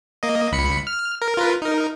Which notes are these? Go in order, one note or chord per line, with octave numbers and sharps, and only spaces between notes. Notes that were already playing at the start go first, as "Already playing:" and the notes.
A#3 D#5
C#2 B5 C#7
F6
A#4
F4 A#4 B4
D#4 A#4